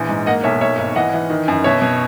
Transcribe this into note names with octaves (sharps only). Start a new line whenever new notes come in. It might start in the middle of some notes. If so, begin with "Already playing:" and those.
Already playing: A#1 E3
G#2
A#3 D#5 F#5
B1 C#5 E5
A#3 C#5 E5
G#1
E3 D#5 F#5
E3
D#3
F#2
B2 C#5 E5
B2